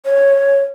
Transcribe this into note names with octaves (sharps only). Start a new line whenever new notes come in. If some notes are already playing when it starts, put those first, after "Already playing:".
C#5